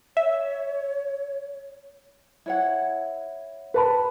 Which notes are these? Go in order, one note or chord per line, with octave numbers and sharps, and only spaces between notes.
C#5 E5
E4 C#5 F#5
B4 A5 B5